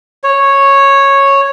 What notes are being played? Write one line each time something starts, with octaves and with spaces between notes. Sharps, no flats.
C#5